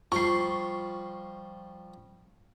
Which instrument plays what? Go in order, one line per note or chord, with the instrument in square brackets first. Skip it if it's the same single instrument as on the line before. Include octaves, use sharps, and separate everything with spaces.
[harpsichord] F3 G3 [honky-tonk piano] C#6 C7